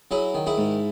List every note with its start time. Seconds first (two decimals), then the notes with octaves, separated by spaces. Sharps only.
0.11 F#3 E4 G#4
0.34 D#3
0.47 E4 G#4
0.58 G#2